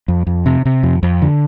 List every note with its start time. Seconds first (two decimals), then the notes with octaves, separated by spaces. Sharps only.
0.08 F2
0.27 F2
0.46 C3
0.65 C3
0.83 F2
1.03 F2
1.22 D3